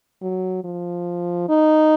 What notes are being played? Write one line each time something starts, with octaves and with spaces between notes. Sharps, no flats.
F#3
F3
D#4